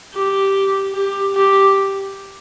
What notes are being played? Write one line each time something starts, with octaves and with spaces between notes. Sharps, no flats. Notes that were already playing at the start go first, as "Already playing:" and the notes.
G4
G4
G4